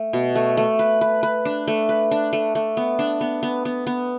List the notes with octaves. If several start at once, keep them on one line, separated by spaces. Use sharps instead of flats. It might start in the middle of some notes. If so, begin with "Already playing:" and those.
Already playing: A3
B2
A3
A3
B4
B4
B4
D4
A3
B4
D4
A3
A3
B3
D4
B3
B3
B3
B3